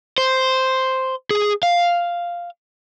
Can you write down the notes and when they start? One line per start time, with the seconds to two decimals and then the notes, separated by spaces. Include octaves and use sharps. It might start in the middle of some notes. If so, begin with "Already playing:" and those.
0.18 C5
1.31 G#4
1.63 F5